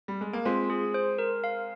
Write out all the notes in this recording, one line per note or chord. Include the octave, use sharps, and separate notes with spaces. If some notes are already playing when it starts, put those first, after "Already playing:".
G3
G#3
A#3
G#3 C4 F4
G#4
C5
A#4
F5